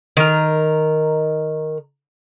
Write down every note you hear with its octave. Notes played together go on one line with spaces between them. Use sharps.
D#3 A#4